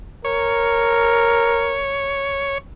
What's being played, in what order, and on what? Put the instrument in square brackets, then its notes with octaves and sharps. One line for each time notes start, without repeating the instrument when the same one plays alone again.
[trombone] A#4 [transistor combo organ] C#5